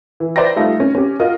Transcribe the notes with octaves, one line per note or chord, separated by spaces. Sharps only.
E3
B4 C5 D5 E5 G5 A#6
G3 A3 D#4 F4
C#4
C#4 G4
F4 F#4 A#4 D#5